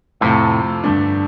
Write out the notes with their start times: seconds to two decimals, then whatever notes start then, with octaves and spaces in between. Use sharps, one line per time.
0.21 F2 A2 C3 F3 C4 F4
0.83 G2 D3 A3 D4